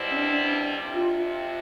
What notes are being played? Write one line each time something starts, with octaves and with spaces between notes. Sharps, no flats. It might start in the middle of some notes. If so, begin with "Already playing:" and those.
Already playing: B2 G3 C4 E4
C#4
D4
F2 C3
F4